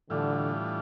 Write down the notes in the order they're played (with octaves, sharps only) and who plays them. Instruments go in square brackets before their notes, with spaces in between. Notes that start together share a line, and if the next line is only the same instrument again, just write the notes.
[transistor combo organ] A2 E3 G3 D4 F4 [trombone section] D3